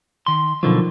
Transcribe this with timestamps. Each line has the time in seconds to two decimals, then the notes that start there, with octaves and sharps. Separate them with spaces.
0.27 D#3 C6
0.63 B2 D3 D#3 F3 F#3